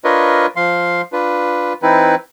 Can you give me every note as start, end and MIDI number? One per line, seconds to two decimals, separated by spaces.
0.04 0.46 62
0.04 0.46 65
0.04 0.46 70
0.04 0.46 71
0.04 0.46 73
0.04 0.46 75
0.56 1.02 53
0.56 1.02 77
0.56 1.02 84
1.13 1.73 62
1.13 1.73 65
1.13 1.73 71
1.82 2.15 52
1.82 2.15 60
1.82 2.15 63
1.82 2.15 64
1.82 2.15 71